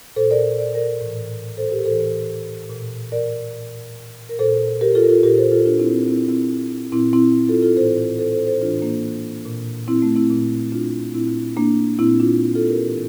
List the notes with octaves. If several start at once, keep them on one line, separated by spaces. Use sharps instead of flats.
A#2 A4 C5
A#4 D5
D5
A#4 D5
A2 E3
A4 C5
G4 A#4
A2 E3 A4 C5
A#2
A#4 D5
A#2
A#4
A#2 A4 C5
G4 A#4
F4 A4
A#4
F4 A4
A#2 G4 A#4
A4 C5
F4 A4
D4 F4
C4 E4
C4 E4
A#2 C4 E4
C4 E4
A#2 C4 E4
C4 E4
F4 A4
F4 A4
A2 E3 A4 C5
A4 C5
A4 C5
A4 C5
A2 E3 D4 F4
A#3 D4
A#2
C4 E4
A3 C4
C4 E4
A#2
D4 F4
A#2 C4 E4
A#3 D4
A#2 C4 E4
D4 F4
F4 A4
G4 A#4
A2 E3